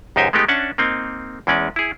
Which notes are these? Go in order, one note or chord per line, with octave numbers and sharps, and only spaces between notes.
C#2 F#2 D#4 G4 C5 G#5
G#3 A3 B3 D#4 G4
C#4 D4 E5 F#5 A5
A#3 C4 D#4
E2 E3 G#3 C#4 D5
E4 G#4